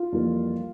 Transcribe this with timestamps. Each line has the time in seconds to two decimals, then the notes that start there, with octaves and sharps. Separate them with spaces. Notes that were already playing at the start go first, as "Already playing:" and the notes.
Already playing: F4
0.12 F2 E3 G3 A#3